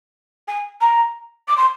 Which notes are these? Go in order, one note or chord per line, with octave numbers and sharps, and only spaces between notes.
G#5
A#5
D6
C6